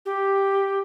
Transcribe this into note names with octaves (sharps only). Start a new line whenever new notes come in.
G4